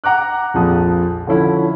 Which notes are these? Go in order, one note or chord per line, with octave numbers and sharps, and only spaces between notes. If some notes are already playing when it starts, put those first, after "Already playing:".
F#5 A#5 D6 F#6
A#1 F2 F3 D#6
D3 F3 C#4 E4